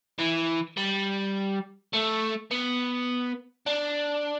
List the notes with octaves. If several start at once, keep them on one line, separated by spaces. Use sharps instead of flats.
E3
G3
A3
B3
D4